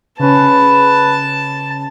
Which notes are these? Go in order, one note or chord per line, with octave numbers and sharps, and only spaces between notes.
C#3 C#4 B4 A5